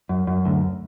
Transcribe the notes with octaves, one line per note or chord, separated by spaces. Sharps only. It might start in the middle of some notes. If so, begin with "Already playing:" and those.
F#2
F#2
D2